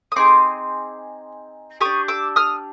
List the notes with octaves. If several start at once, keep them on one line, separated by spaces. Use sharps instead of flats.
D#6
C4 D#4 G#4 C6 D6
D4 G4 C#6 D#6
D6 E6
D#6 F6